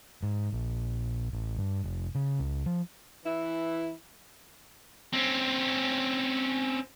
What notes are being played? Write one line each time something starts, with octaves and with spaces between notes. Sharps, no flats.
G#2
A#1
A1
G2
F1
C#3
C#2
F3
E3 E4
C4 C#4